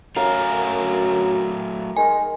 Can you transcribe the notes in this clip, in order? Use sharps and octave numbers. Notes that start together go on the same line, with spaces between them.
F#2 F#3 A3 A#4 F5
D#3 G#3 G#5